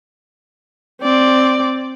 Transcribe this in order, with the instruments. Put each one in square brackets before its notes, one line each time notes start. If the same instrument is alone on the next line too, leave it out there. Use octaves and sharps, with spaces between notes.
[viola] C4 D5